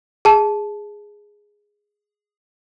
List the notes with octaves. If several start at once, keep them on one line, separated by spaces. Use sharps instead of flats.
G#4 A5